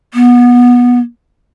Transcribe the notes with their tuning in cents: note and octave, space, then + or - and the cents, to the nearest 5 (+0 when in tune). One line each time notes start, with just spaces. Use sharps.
B3 -20